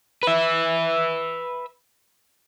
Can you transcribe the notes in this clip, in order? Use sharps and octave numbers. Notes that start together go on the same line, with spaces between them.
B4 E5